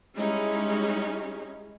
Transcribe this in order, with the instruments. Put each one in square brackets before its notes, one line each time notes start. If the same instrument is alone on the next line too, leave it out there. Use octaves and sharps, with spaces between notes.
[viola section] G3 G#3 C#4 D#4 E4